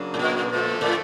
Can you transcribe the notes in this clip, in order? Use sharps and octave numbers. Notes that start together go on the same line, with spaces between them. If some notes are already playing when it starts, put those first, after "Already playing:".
Already playing: C#3 F#3 A#3 D4
A2
A#2
D3 F3 A3
A2